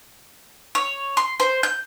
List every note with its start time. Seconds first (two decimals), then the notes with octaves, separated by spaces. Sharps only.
0.75 C#5
1.17 C6
1.40 C5
1.63 G6